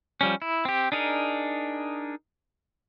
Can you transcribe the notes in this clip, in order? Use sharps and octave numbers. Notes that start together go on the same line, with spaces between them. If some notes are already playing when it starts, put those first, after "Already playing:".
F3 G3 C#4
E4
C4 G4
D4 D#4 G#4 A#4